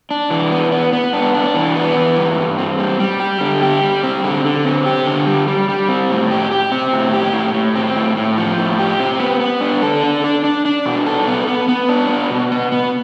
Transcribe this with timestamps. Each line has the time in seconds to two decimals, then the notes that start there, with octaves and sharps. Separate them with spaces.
0.11 D4
0.30 E3
0.52 B3
0.72 B3
0.93 B3
1.13 D4
1.34 D4
1.54 E3
1.76 B3
1.97 E3
2.17 G2
2.37 G2
2.58 C4
2.79 G3
3.00 G3
3.20 G4
3.41 D3
3.62 G4
3.83 G3
4.03 C4
4.24 D3
4.44 D3
4.65 C4
4.86 G4
5.07 D3
5.27 G3
5.48 G3
5.69 G3
5.89 C4
6.10 A2
6.31 G4
6.51 G4
6.72 C4
6.93 A2
7.13 G4
7.33 A2
7.54 A2
7.76 C4
7.97 A2
8.17 A2
8.38 F3
8.58 A2
8.79 G4
9.00 C4
9.20 B3
9.40 B3
9.61 D4
9.82 A4
10.03 D4
10.24 D4
10.44 D4
10.65 D4
10.86 B2
11.06 A4
11.28 B3
11.47 B3
11.68 B3
11.89 D4
12.09 B3
12.30 B2
12.52 B3
12.72 B3